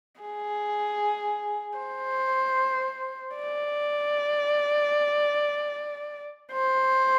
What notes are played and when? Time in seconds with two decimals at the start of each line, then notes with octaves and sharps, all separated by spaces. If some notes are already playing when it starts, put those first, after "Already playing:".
0.21 G#4
1.78 C5
3.36 D5
6.52 C5